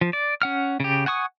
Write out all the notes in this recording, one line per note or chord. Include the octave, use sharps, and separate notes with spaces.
F3
D5
C#4 F#5 F6
C#3 G4
F#5 G#5 C#6 D#6